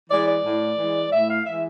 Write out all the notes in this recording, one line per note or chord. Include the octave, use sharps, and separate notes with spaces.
E3 G#3 D5
D5
A2
E3 G#3
A2 E5
F5
E3 G#3 E5